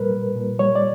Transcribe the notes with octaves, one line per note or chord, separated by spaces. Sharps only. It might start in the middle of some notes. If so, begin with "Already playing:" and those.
Already playing: A#2 G3 A#4 B4
G3
A#2
G3 C#5
D5